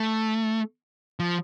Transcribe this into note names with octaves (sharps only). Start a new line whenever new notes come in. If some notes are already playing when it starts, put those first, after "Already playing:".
Already playing: A3
F3